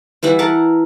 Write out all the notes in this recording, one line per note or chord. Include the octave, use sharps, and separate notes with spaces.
E3 G3 E4 F#5
A#4 F#5 A5